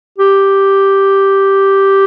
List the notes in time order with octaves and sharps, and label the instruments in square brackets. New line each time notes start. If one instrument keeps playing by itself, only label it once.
[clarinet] G4